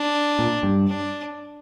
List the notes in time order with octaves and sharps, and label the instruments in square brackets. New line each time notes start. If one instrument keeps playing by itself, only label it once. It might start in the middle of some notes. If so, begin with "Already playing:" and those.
Already playing: [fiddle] D4
[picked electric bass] A#2
G2
[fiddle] D4